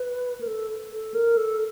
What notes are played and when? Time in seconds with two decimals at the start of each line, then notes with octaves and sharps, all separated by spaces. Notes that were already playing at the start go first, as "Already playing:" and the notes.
Already playing: B4
0.41 A#4
0.47 A4
0.91 A4
1.14 A#4
1.37 A4